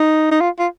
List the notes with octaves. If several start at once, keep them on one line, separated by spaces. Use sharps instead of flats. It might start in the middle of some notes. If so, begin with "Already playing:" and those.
Already playing: D#4
D#4
F4
F4